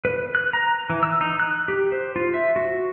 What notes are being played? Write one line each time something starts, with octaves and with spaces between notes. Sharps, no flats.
B4
F#6
A#5
E3
E6
D#4
F#6
G4
C5
F4
E5
F#4